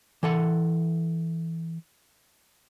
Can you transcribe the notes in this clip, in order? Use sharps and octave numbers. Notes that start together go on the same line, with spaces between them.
E3 A4 F#5